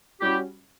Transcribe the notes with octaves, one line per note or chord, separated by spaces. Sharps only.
G3 C#4 E4 F#4 G4